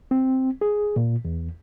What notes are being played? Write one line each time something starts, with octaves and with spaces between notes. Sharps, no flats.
C4
G#4
A#2
E2